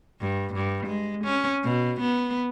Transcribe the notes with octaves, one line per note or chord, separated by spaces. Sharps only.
G2
G2
G#3
C#4
B2
B3